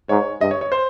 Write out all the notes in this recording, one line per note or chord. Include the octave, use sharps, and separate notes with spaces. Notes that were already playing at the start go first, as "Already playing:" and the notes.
G#2 C#5
G2 D#5
C#5
C#5
C5